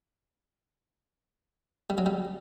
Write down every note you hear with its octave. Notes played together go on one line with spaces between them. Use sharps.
G3
F#3
G3